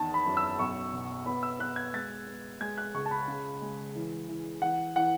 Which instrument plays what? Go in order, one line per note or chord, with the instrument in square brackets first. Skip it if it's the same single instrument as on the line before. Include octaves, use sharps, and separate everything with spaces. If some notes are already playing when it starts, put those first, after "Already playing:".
Already playing: [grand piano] E2 D#3 A5
B5
F#2
E6
B1 C#6
B2
B3 B5
E6
B3 F#6
G#6
G#3 A6
B3
G#3 G#6
F#6
C#2 C#6
A5
B5
C#3
G#3
E3
E3
E3 F#5
E3 F#5